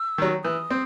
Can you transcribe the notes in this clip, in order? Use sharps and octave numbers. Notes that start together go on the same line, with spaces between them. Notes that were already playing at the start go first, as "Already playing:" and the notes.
Already playing: E6
D#3 F#3
E3 D#6
C4